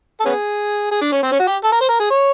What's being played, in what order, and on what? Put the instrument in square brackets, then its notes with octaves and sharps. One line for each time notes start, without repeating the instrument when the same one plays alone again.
[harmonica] A4
B3 C#4 G#4
G#4
D4
C#4
C4
C#4
F#4
G4
A4
A#4
C5
A#4
G#4
C#5